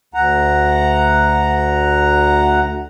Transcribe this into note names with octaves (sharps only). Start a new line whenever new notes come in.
D2 F#5 A#5